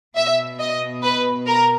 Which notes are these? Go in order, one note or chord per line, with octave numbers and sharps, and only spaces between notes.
B2 E5
D#5
B4
A#4